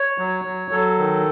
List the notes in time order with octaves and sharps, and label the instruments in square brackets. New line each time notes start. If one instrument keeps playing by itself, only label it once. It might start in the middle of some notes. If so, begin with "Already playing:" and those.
Already playing: [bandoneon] C#5
F#3
F#3
F#3 A4
D#3